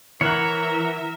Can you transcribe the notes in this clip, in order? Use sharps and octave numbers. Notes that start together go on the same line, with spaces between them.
E3 A#4 C#5 E5 F#5 A#5